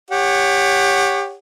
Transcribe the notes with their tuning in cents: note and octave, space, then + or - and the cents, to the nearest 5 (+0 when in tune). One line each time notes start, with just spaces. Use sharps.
G4 +20 C#5 +0 F#5 +0